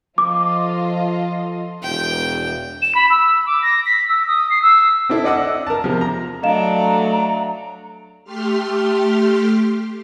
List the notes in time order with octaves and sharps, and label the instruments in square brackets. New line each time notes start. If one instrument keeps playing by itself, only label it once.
[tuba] F3 [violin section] F4 A4 D#5 [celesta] D6
[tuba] E1 [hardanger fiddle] G5
[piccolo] E7
B5
E6
D6
A#6
B6
E6
D#6
C7
E6
[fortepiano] C4 D4 E4 A4
D4 D5 D#5 F#5 D6 E6
A#4 A5
E2 C3 F3
A#5
[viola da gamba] F#3 D4 [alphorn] A3 [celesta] D#5 F5 E7 [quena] A#5
[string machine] A3 G4 C6 F6